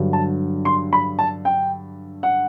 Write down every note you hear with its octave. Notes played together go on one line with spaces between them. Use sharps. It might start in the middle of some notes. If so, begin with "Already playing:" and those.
Already playing: G2 D3 F#3
A5
C6
B5
A5
G5
F#5